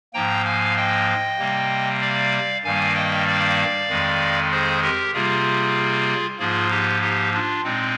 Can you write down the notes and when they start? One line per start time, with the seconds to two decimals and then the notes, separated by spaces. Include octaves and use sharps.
0.14 G#2 F3 A#3 G5 A#5
0.45 F5 G#5
0.76 D#5 G5
1.39 C3 G3 A#3
2.01 D5 F5
2.64 G2 D#3 G3 A#3 F5 G#5
2.95 D#5 G5
3.27 D5 F5
3.89 F2 D#3 G#3
4.51 G#4 C5
4.82 G4 A#4
5.14 C3 G3 A#3 F4 G#4
6.39 G#2 F3 A#3 F4 G#4
6.71 D#4 G4
7.01 D#4 G4
7.33 D4 F4
7.64 A#2 G#3 C4 D#4